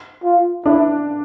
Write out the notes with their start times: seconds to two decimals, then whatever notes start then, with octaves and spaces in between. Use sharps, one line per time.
0.24 F4
0.66 D4 E4